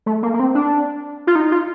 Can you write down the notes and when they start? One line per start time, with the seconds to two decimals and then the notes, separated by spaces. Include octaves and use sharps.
0.06 A3
0.23 A#3
0.34 A#3
0.40 C4
0.55 D4
1.27 F4
1.36 D#4
1.52 F4